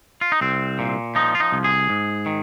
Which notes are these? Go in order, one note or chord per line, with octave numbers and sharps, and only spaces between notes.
F4
D#4
C2 C4
A#2
F3 D#4
F4
D#4
C2
G#4
G#2
D#3